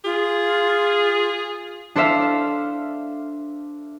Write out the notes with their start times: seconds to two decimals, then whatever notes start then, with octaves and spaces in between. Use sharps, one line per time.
0.05 F4 G#4
1.96 D4 A4 C5 D5 E5 F5